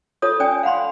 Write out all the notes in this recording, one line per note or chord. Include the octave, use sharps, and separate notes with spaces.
F4 A4 C#5 D#6
C#4 D5 G5 G#5 D#6
F5 F#5 B5 C6